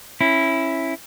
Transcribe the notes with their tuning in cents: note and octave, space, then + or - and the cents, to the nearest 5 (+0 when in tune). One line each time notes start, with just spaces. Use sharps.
C#4 -25 E4 +0